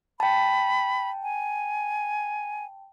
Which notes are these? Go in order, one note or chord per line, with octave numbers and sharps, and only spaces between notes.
G5 A5 B5
G#5